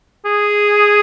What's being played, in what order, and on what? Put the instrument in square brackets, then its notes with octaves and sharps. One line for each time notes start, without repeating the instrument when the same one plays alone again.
[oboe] G#4